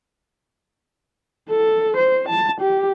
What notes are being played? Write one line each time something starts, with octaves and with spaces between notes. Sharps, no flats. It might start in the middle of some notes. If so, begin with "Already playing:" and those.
A4
C5
A5
G4